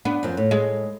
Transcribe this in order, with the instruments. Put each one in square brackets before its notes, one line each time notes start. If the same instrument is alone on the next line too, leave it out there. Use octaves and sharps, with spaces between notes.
[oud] B3 [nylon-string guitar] D4
[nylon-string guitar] F#2 F3
A2
[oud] G#3